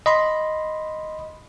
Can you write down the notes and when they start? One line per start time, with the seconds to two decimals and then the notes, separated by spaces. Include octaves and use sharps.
0.06 D#5 B5 C6